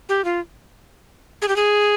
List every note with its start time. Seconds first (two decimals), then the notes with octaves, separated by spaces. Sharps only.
0.09 G4
0.24 F4
1.42 G#4
1.48 G4
1.56 G#4